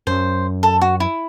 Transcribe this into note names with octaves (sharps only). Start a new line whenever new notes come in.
F#2 C5
A4
F#4
E4